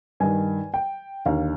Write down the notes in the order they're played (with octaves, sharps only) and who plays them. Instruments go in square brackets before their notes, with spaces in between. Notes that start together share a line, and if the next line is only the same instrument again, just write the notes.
[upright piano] G2 D#3 G#5
G5
D#2 D3 F5